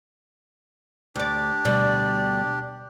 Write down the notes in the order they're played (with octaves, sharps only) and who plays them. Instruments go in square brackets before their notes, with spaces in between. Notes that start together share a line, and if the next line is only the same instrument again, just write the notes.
[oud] D2 D5 [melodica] D4 G4
[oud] D2 B2 G3 [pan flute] D5